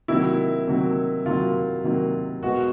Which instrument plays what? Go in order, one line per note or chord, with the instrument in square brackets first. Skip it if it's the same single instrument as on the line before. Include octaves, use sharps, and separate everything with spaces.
[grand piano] C3 D#3 F#3 A#3 E4
C3 D#3 F#3 A#3
C3 D#3 F#3 A#3 F4
C3 D#3 F#3 A#3
B2 G#3 B3 F#4